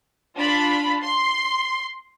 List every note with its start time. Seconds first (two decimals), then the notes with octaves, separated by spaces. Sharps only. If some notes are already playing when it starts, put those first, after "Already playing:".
0.36 D4 F4 B5
1.03 C6